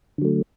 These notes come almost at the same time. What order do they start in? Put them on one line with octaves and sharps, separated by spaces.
D3 F#3 A3